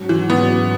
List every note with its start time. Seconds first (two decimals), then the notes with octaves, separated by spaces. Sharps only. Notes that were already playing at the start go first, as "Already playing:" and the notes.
Already playing: G#2 F#3 C#4 F#4
0.09 E3
0.30 B3